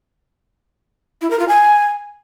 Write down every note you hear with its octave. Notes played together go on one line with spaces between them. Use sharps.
E4
A#4
F4
G#5